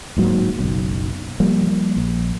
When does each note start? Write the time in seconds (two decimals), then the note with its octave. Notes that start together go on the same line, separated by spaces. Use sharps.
0.17 D1 G#2 F#3 A#3
0.59 F#1 B1
1.40 F3 G3 A#3
1.97 A#1